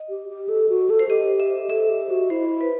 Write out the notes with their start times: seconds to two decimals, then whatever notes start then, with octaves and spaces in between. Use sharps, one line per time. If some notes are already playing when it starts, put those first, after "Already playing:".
Already playing: D#5
0.10 G4
0.29 G4
0.49 A4
0.69 F#4
0.90 A4
0.99 C5
1.09 G4 D#5
1.40 E5
1.70 A4 E5
1.90 G4
2.10 F#4
2.30 E4 C5
2.61 B4